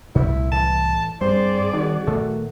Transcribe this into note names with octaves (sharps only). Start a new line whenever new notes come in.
C2 A#2 A3 C4 E4
A2 E3 A5
G2 G3 G#3 C4 G#4 C5 D5
D#3 F#4
A#2 D#3 F#3 A3